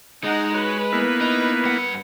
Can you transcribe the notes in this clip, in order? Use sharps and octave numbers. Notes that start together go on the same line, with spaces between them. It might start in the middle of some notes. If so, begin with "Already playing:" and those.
G#3 D#4 F#5
F#4 B4 C#5
A#3 B3 E4
D#4
G2 F#5